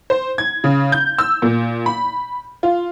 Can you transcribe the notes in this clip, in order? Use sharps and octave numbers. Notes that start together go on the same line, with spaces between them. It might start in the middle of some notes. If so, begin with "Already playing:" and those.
C5
G#6
C#3
G6
E6
A#2
B5
F4